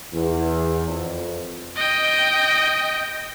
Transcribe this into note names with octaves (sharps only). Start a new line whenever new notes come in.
E2
F2
D#5 G5